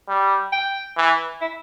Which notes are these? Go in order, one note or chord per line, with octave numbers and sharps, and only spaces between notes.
G3
G5
E3
E4